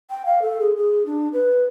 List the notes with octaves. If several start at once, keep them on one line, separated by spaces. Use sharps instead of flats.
G5
F5
A4
G#4
G#4
D4
B4